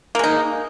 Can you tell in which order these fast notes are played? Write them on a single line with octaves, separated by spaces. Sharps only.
A#3 G#3 D#4